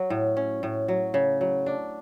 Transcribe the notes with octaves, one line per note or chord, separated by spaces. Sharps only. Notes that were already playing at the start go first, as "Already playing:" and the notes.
Already playing: F#3
A2
C#4
A2
F#3
C#3
F#3
D4